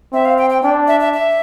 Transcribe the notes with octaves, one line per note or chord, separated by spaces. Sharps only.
C4 E5
F5
G5
G5
D4 G5
E5
E5
E5